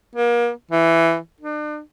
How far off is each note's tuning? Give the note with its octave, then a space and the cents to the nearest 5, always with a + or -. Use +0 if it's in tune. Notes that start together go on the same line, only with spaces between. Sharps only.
A#3 +35
E3 +10
D4 +40